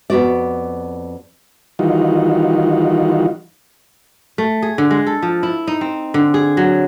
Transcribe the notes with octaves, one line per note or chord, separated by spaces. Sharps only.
F2 B3 F#4 D5
D#3 E3 G3 D#4 F4 F#4
A3
G#4
D3
G#3
A4
F3
E4
D#4
C4
D3
G#4
F#3